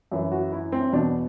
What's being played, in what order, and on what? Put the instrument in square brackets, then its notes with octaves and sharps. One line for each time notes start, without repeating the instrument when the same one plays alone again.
[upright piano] F#2 E3
F#4
E4
C4
E2 B2 D4